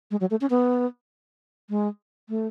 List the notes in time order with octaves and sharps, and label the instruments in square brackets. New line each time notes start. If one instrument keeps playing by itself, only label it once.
[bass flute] G#3
F#3
A3
C#4
B3
G#3
A3